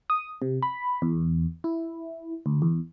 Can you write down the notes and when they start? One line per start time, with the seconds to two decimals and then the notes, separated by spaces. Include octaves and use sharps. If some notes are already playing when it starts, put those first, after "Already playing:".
0.10 D#6
0.42 C3
0.62 B5
1.02 E2
1.64 E4
2.46 D2
2.62 E2